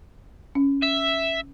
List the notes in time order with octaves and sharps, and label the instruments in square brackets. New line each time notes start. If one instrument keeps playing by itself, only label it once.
[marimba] C#4
[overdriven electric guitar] E5